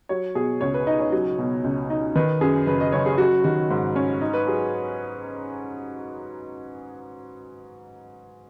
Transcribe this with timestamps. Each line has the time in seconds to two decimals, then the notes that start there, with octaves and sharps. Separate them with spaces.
0.09 F#3 C#5
0.35 B2 G#4
0.61 C#2 C#5
0.74 B4
0.87 D#4 D#5
1.00 C#5
1.12 F#3
1.39 B2
1.64 C#2
1.90 D#4
2.16 D#3 B4
2.41 F#2 G#4
2.66 F#1 B4
2.80 D#5
2.92 F#1 C#5
3.06 G#4
3.18 F#3 F#4
3.44 D#3 F#4
3.70 G#2
3.96 C#4
4.21 D#4
4.33 B4
4.47 F#3 G#4